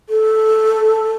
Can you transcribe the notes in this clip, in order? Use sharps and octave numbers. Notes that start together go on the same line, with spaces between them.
A4